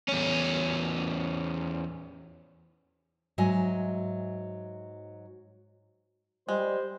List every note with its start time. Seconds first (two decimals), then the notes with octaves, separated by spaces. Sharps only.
0.08 E2 C#4
3.38 G#2 F#3 D#5 E5 G#5
6.49 G3 G#3 C5